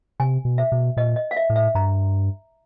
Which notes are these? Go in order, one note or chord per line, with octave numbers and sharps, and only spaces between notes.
C3 G#5
B2
E5
B2
A#2 D#5
D#5
F5
E5
A2
E5
G2 A#5